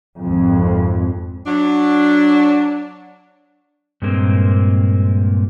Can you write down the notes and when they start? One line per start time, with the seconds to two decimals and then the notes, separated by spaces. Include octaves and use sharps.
0.20 G#1 F2
1.47 F#3 D4
4.02 G2 A#2 G#3 A#3 C4